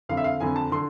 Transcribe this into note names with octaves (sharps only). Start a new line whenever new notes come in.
F2 D3 F5
E5
F5
F2 D3 G#5
A5
D3 C6